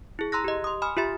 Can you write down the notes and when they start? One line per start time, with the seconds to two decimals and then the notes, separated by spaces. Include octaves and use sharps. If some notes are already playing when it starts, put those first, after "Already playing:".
0.19 E4 G#4
0.32 A#5 C6 E6 F#6 A#6
0.44 G4 D#5
0.64 C6 D#6
0.82 G#5 B5 D#6 F6
0.97 F4 G4 E5 B5 A6